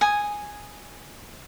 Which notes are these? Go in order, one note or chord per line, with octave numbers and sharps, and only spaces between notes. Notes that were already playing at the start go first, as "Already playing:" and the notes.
G#5 D#6